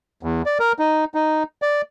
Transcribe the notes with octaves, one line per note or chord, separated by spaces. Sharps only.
E2
D5
A#4
D#4
D#4
D5